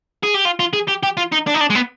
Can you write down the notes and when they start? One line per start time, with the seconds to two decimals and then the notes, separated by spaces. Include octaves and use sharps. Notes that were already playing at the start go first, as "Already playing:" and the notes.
0.23 G#4
0.34 G4
0.45 F4
0.59 F4
0.73 G#4
0.88 G4
1.03 G4
1.17 F4
1.32 D#4
1.47 D4
1.54 D#4
1.61 D4
1.70 G#3
1.75 B3